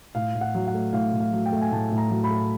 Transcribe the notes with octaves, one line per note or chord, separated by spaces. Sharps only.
A2 F5
A2
F#5
F#3
F#5
A3
A2 F5
A2
F5
F#3
G5
A3
G#5
A2 A5
A2
A#5
F#3
B5
A3